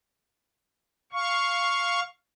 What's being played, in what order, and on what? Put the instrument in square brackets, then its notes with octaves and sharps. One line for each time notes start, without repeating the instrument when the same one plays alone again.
[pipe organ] F5 C#6